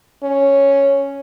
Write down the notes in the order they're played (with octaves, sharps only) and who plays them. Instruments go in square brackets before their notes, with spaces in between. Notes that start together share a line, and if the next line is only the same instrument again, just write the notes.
[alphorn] C#4